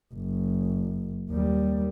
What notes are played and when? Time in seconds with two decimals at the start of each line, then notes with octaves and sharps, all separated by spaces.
0.14 F#1
1.30 D#2 G3